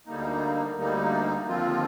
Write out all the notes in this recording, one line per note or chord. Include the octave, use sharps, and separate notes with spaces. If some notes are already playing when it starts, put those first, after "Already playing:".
D2 D3 G3 A#3 D#4
D2 D3 G3 A#3 D#4
D#2 D3 F3 C4 F4